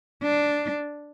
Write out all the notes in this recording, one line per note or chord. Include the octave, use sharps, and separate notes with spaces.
D4